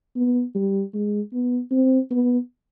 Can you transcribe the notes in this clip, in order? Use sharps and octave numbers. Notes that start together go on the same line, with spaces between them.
B3
G3
G#3
B3
C4
B3